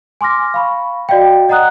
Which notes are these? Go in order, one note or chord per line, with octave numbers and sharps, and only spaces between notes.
G#5 C6 D6 F6 A#6
F5 B5 C#6
F#4 D5 D#5 F5 G5
D5 D#5 F#5 A#5 D#6 F#6